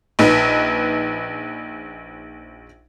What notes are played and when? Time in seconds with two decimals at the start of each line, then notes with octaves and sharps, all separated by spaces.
0.19 A#1 D#4 B4